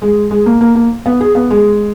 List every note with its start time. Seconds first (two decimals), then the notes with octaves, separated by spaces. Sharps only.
0.02 G#3
0.31 G#3
0.46 A#3
0.61 A#3
0.75 A#3
1.06 B3
1.21 G#4
1.35 B3
1.51 G#3